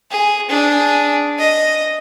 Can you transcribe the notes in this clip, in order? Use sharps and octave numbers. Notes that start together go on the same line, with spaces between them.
G#4
D4 G#4
D#5